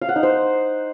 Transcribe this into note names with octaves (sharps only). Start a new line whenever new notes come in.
F5
F#5
D#4
C5